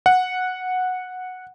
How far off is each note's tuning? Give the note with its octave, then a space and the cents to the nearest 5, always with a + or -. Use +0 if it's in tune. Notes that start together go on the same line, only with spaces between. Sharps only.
F#5 -10